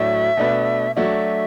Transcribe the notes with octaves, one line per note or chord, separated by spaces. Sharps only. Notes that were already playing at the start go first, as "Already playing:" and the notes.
Already playing: A2 F#3 D4 F#4 D5 E5
B2 A3 D4 B4
F#3 A3 D4 F#4 E5